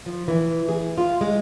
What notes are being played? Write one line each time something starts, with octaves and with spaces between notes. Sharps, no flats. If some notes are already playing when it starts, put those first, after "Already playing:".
F3
E3
G#4
F4
G#3